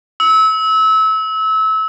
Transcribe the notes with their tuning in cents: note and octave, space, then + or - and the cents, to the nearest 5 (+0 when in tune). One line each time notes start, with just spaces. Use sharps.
E6 -30